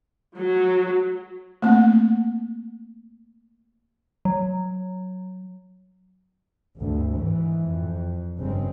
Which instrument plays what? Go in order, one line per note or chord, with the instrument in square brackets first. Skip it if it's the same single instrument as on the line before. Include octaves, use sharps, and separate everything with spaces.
[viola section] F#3
[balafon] A3 A#3 C4
[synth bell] F#3
[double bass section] G#1 D2 G2
G#2 E3
F2
G1 G2 C#3 G#3 C4